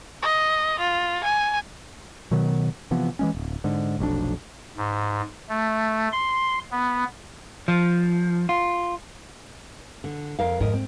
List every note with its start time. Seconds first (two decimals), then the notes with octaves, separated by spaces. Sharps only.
0.22 D#5
0.79 F4
1.24 G#5
2.31 B2 D#3 F#3 B3
2.91 C3 E3 F3 B3
3.19 E3 G#3 C#4
3.34 D1
3.64 G#2 D3
3.99 F1 B1 F2 D4
4.77 G#2
5.49 A3
6.12 C6
6.72 B3
7.68 F3
8.49 F4
10.04 D3
10.39 F2 A#4 F5
10.60 F2 G#2 A#4 D#5
10.74 C4